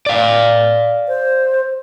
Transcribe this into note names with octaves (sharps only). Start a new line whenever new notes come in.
D5 F5
C5